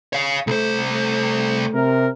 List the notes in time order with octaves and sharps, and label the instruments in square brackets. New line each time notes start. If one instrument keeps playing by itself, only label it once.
[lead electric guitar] C#5 F5
[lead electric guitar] C2 C5 [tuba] A3
[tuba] A3
[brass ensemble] C3 A#4